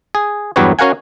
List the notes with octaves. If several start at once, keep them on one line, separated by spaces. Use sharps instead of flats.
G#4
E2 G2 F#3 G4 B4 C#5
C#4 F#4 A#4 F5 F#5 G#5